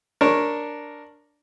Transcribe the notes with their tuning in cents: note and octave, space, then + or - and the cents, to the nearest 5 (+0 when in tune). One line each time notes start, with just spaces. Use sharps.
D4 +0 A#4 +0 C#5 -15